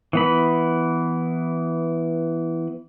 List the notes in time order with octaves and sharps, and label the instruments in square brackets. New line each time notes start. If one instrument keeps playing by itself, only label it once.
[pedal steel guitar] E3 B3 B5